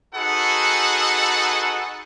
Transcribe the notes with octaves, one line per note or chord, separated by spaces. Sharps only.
D#4 F#4 G#4 A4 B4 F#5